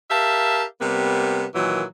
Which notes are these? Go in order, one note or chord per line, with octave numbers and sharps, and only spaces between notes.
G4 A#4 E5 F5 A5
C3 G3 A#3 B3
A#2 D#3 E3 F#3